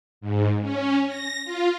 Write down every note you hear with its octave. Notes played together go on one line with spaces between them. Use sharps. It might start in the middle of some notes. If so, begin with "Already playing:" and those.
G#2
C#4
A#6
F4